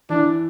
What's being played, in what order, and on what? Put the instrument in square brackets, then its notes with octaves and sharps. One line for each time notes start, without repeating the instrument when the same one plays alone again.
[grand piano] E3 [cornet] D4